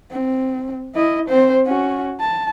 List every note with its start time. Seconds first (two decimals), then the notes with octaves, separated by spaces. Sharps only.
0.12 C4
0.95 E4 D#5
1.28 C4 C5
1.66 C#4 F#4
2.20 A5